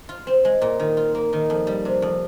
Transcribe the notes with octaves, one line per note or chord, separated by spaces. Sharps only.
F4
C4
G#3
A#2
D#3
F4
A#3
D#3
F2
G3
C3
F2